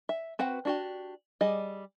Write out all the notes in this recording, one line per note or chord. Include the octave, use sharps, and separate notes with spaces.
E5
C4 F#4 B4 F#5
D4 F#4 G4
G3 G#4 D#5